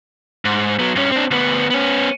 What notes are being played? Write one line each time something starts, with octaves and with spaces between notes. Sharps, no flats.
G#2
F#3 B3
G2 C#4
C4 D4
D2 B3
B3 C#4